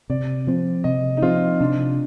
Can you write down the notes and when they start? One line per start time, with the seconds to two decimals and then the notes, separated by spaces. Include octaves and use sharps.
0.10 C3 D5
0.47 F3 C4
0.84 C3 D#5
1.17 D#4
1.22 F3 C4 F4
1.60 C3 D4